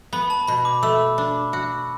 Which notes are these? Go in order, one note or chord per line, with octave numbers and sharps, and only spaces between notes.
B3 B5
A5
B2 B5
D6
A3 E6
D4
F#4